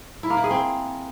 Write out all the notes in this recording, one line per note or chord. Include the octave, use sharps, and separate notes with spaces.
E4
A#3
E4
G#4
C4